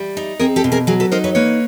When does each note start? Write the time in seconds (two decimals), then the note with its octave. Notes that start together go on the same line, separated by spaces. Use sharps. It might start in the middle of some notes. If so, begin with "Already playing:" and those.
Already playing: G3
0.17 D#4
0.40 C4 G#4 A#4
0.56 G4 A4
0.64 B2
0.72 G#4 A#4
0.87 F#3 G#4 A#4
1.00 A4 B4
1.12 D#4 A#4 C5
1.24 B4 C#5
1.35 A#3 B4 C#5